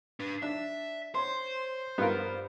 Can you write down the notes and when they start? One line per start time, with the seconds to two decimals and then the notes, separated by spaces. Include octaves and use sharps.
0.20 D4 B4
0.42 D4 E5
1.15 C5 C#5 C6
1.98 G2 B3 F4 A#4